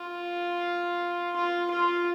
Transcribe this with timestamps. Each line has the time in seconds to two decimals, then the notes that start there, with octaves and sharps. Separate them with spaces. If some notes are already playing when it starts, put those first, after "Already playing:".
Already playing: F4
1.36 F4
1.71 F4